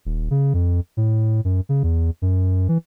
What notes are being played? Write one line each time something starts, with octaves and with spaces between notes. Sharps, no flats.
D#1
C#3
F2
A2
F#2
C#3
E2
F#2
E3